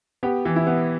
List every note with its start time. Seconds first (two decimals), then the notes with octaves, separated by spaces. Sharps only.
0.23 B3 G4
0.45 E3
0.56 E4
0.67 B3